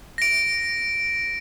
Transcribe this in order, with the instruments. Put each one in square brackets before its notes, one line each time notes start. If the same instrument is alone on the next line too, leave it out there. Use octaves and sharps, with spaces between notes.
[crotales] A#6 D7